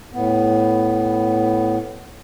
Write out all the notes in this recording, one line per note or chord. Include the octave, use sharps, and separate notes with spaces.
A2 B3